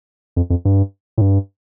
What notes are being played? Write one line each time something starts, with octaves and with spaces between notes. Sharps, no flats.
F2
F2
G2
A2
G2